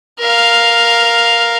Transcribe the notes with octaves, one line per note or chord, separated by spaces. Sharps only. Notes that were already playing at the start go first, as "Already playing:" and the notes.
A#4 F5